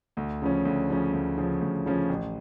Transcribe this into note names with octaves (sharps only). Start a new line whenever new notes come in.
D2
C#3 F3 C#4
D2
C#3 F3 C#4
D2
C#3 F3 C#4
D2
C#3 F3 C#4
A1